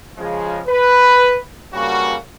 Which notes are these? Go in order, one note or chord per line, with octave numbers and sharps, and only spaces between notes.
C#3 F3 G#3
B4
G2 C#3 G3 A#3 F#4